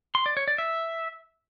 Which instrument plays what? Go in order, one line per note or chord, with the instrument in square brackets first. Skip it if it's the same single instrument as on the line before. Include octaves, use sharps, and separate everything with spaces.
[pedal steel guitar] C6
D5
C#5
D5
E5